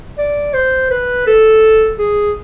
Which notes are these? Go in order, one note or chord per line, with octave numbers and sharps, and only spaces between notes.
D5
C5
B4
A4
G#4